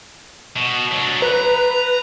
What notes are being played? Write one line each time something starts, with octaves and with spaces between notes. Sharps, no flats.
B2
F#3 D4
B4 A#5